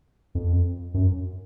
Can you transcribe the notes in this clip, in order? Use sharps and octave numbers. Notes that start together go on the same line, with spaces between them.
F2
F#2